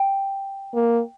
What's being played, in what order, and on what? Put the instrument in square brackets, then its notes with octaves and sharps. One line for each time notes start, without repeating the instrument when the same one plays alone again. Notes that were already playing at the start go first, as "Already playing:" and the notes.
Already playing: [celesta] G5
[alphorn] A#3